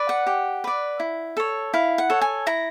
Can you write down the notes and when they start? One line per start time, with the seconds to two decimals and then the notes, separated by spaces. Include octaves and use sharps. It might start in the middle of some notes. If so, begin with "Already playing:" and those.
Already playing: B4 D5
0.09 F#5
0.27 G4
0.64 B4 D5
1.00 E4
1.37 A4 C#5
1.74 E4 F5
1.98 F#5
2.10 A4 C#5
2.21 G#5
2.47 E4 A#5